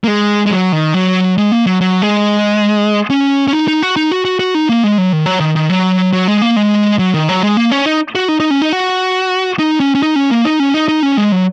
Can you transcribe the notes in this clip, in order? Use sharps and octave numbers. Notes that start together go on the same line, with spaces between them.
A#3
G#3
G#3
F#3
D#3
F#3
G#3
A#3
F#3
F#3
G#3
C#4
C#4
D#4
D#4
F#4
D#4
F#4
F#4
F#4
D#4
A#3
G#3
F#3
D#3
F#3
D#3
D#3
F#3
F#3
G#3
A#3
G#3
F#3
D#3
F#3
G#3
A#3
C#4
D#4
F#4
D#4
D#4
C#4
D#4
F#4
D#4
C#4
C#4
D#4
C#4
A#3
D#4
C#4
D#4
D#4
C#4
G#3
F#3